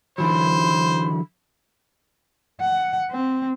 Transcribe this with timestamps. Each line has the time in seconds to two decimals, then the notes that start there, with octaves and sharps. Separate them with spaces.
0.18 D3 E3 F#3 C5 B5
2.61 F#5
3.11 C4